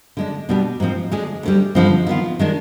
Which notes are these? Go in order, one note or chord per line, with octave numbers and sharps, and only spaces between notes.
D3 G#3 D4
B2 G3 D4 G4
G#2 F3 C4
D3 G#3 D4 G#4
D2 D3 G3
G2 D3 F3 G#3 C4
D#3 B3 F4
D#3 G#3 D4